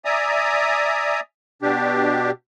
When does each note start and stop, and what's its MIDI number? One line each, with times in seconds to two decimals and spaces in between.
0.05 1.20 74
0.05 1.20 76
0.05 1.20 80
0.05 1.20 82
0.05 1.20 87
1.62 2.31 47
1.62 2.31 62
1.62 2.31 67